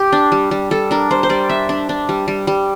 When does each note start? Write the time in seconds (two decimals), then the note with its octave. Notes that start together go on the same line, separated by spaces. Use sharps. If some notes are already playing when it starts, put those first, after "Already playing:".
Already playing: G4
0.12 D4
0.32 G3
0.51 G3
0.71 G3 A4
0.91 D4 A#4
1.11 G3 C5
1.23 C5
1.29 G3 D5
1.49 D4 E5
1.69 D4
1.89 D4
2.09 G3
2.28 G3
2.47 G3